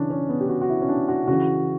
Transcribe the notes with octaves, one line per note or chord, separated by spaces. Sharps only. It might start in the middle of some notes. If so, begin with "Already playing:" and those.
Already playing: C#3 E3 C#4 D4
C#4
B3
G4
F#4
F#4
E4
C#4
D4
F#4
C#3 F#4
E3